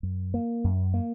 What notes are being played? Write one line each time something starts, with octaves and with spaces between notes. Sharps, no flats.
F#2
A#3
F#2
A#3